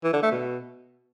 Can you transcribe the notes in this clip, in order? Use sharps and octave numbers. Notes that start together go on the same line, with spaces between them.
E3
D3
A3
B2